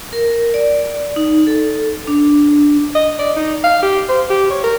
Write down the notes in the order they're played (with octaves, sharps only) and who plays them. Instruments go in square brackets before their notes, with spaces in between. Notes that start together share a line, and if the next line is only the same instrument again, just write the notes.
[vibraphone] A#4
D5
D#4
A4
D4
[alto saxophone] D#5
D5
D#4
F5
G4
C5
G4
C#5
A#4